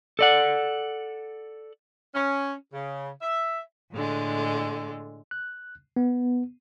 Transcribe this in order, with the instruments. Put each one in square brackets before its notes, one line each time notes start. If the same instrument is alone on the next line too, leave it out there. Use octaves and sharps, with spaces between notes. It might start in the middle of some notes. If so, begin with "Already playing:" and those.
[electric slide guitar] A4 D5 F#5
[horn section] C#4
C#3
E5
[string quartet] A2 D3 G#3
[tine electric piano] F#6
B3